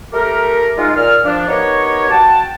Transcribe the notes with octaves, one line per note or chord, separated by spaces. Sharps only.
A3 G4 A#4
G#3 D#4 F4
A#2 F6
F3 D4
B3 D#4 G4 A#4 C#5
F#4 G5 A5